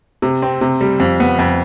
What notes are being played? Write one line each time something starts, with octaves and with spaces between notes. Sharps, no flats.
C3
C4
C3
G3
F2
B3
F2